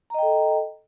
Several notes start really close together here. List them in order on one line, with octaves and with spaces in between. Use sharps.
A#5 D#5 G5 A4